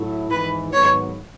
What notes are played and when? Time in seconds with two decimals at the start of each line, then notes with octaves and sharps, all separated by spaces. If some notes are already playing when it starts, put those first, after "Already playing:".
Already playing: A2 F#3 A3 E4
0.31 G#1 G#2 E3 B4
0.72 G#1 G#2 F#3 B3 C#5